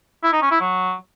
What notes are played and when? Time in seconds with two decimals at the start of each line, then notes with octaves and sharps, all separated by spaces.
0.23 E4
0.32 D#4
0.42 C#4
0.51 E4
0.60 F#3